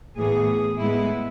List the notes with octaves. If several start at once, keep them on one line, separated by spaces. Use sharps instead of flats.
A2 E3 B3 G#4
A2 G#3 B3 E4